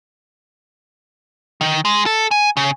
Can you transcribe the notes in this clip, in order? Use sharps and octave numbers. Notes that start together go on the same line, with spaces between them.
D#3
G#3
A4
G#5
C#3